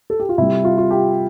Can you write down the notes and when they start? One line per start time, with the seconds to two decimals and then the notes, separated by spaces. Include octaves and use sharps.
0.10 A4
0.20 G4
0.29 F4
0.38 C3 G3 E4
0.65 F4
0.78 F4
0.91 G4